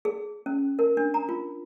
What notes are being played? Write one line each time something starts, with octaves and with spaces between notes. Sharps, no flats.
G#4
C#4
A#4
D4
A#5
F4